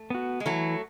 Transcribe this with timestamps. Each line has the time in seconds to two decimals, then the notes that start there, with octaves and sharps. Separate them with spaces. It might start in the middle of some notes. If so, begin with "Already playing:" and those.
Already playing: A3
0.10 B3 F#4
0.40 G#3
0.46 E3 F#3 A3